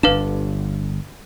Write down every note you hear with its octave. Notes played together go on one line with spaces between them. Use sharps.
G1 D4 B4 F5 E7